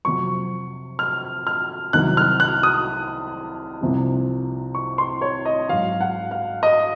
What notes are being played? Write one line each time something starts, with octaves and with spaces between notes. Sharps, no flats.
F2 C3 F#3 C#6
F6
F6
C2 C3 D#3 F#3 F#6
F6
F#6
D#6
C2 C3 F3
C#6
C6
C#5
D#5
G#2 F#3 F5
F#5
F5
D#5